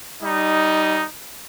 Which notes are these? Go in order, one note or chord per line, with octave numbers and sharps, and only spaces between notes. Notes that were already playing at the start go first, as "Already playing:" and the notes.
G3 D#4